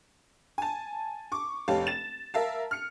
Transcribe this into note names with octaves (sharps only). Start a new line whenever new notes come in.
G#5 A5
C#6 D6
F1 G4 C#5 F5 A5
A6 E7
A#4 E5 F5 A5
F6 C#7